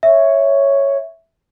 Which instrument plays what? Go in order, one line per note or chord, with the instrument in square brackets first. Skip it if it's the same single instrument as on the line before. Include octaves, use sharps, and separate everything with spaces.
[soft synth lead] C#5 [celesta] E5